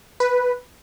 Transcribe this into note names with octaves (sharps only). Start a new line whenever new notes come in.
B4